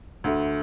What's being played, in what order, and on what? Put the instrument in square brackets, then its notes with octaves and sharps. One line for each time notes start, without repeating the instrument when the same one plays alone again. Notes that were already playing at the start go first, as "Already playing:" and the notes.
[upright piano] D2 D3 A3